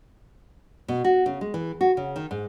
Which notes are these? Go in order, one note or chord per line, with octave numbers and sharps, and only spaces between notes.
B2
F#4
C#3
G#3
E3
F#4
C#3
D#3
G#2